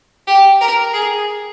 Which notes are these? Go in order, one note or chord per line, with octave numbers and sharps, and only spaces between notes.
G4
A#4
G#4